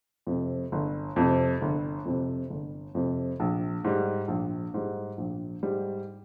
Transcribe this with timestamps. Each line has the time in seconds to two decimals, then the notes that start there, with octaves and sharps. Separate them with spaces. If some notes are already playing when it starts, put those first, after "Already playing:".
0.27 F2 C3
0.72 G1
1.16 F2 C3
1.61 G1
2.05 F2 C3
2.50 G1
2.95 F2 C3
3.40 A#1
3.84 G#2 G3
4.28 A#1
4.74 G#2 G3
5.18 A#1
5.63 G#2 G3